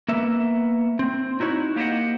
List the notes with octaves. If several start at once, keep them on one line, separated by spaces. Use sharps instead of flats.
A#3 B3 E5
C4
D#4 E4 F#4 C#5
A#3 G4 C5 D#5 F#5